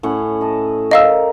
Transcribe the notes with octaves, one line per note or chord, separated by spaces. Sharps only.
A2 C#4 F#5
D#5 A5
A#4 D#5 F5 E6